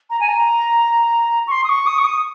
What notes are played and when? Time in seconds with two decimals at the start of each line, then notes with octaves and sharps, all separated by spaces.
0.10 A#5
0.20 G#5
0.29 A#5
1.47 C#6
1.51 C6
1.64 D#6
1.69 C#6
1.86 D#6
1.99 C#6
2.04 D#6